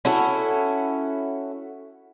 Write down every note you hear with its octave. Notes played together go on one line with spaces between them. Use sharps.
C#4 E4 F#4 A4